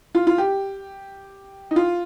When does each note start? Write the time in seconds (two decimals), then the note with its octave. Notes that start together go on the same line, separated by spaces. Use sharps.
0.15 F4
0.27 F4
0.38 G4
1.71 D#4
1.76 F4